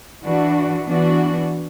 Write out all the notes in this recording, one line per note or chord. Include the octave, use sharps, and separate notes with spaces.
E3 D4 F#4
E3 B3 D4 F#4